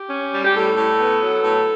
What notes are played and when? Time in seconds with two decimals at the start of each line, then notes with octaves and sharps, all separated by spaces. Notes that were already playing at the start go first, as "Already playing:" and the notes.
Already playing: G4
0.10 C#4
0.32 G3
0.44 G4
0.54 A2 A4
0.76 A2
0.99 B3
1.20 F#3
1.42 A2